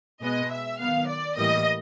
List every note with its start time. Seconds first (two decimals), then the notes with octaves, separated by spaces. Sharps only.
0.22 B2 G#3 B3 D#5
0.51 E5
0.79 D#3 F#3 B3 F5
1.07 D5
1.36 A2 E3 G3 A#3 D#5